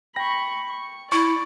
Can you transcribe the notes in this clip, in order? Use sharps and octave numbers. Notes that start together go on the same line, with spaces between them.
G5 B5 C#6 A#6
C#6
E4 D5 C#6